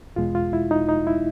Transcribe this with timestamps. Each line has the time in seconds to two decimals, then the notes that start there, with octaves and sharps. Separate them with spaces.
0.16 E2 B2 G#3 F4
0.35 F4
0.53 E4
0.71 D#4
0.89 D#4
1.07 E4